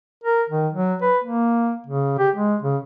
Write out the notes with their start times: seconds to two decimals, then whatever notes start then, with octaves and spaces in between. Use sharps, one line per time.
0.24 A#4
0.50 D#3
0.73 F#3
1.02 B4
1.24 A#3
1.87 C#3
2.18 G4
2.35 G#3
2.62 C#3